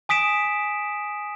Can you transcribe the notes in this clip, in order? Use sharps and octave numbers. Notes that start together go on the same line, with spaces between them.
G#5 D#6 B6 D7 E7